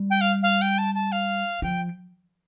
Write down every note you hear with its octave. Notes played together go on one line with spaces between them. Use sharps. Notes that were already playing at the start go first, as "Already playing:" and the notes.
Already playing: G3
G5
F5
F5
G5
A5
A5
F5
F3 G5